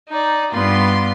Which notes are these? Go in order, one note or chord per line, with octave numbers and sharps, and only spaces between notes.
D#4 D5
G2 B3 F4 C6